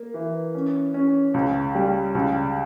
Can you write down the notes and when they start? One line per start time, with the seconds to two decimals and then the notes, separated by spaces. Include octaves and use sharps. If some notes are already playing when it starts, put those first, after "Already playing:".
Already playing: A#3
0.14 E3
0.55 C#4
0.94 C#4
1.34 C#2
1.75 G3
2.15 C#2